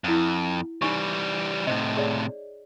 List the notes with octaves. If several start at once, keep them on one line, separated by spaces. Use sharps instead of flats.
F2 E4 F#5
E3 G3 D#4 G#5 C#6
A2 C3 D#4 C5 D#5
G#4 C#5 D5